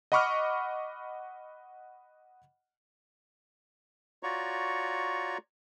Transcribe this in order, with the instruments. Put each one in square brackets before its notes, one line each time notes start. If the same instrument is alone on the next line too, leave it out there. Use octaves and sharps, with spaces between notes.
[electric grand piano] D#5 F#5 B5 C#6 D6 F6
[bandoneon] F4 F#4 C#5 D5 A#5 C#6